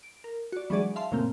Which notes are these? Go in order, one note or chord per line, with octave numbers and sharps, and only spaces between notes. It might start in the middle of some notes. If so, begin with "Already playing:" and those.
D7
A#4
F#4 D5
E3 F#3 G#3 D4 G#4 D5
E5 F5 A5 C6
F#2 A#2 C#3 A3 A#3 C4